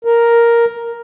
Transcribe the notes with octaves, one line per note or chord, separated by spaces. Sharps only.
A#4